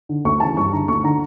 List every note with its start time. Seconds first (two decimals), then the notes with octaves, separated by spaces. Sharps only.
0.09 D3
0.25 D2 C#6
0.40 C#3 E3 A5
0.57 G2 C#6
0.73 D3 A#5
0.88 D2 C#6
1.04 D3 A#5